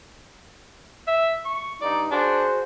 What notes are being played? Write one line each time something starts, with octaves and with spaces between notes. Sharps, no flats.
E5
C#6
G2 D#4 D5
D4 F#4 G#4 C5